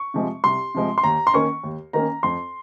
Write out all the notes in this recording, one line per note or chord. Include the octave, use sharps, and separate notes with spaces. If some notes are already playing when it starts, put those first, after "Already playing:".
Already playing: C#6
C3 F3 G#3
C2 C6
C3 F3 G#3
C6
D#2 A#5
C6
D#3 A#3 C#4 C#6
D#2
D#3 A#3 C#4 A#5
F2 C6